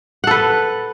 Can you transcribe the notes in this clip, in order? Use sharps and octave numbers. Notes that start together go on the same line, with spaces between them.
A4 B4 F#5